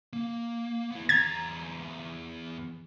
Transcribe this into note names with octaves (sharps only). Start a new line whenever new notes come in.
A#3
B3 E4
E2 A#5 G#6 A6